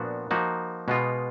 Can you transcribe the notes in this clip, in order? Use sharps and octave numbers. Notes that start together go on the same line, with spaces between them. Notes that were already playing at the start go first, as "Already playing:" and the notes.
Already playing: A#2 F3 B3 D4 F#4
F3 A#3 D#4 F#4
B2 G#3 B3 F4